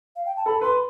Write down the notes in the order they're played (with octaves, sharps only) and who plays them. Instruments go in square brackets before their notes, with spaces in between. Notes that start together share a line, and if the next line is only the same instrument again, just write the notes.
[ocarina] F5
G5
A5
[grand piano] A4 [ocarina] B5
[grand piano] B4 [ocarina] C6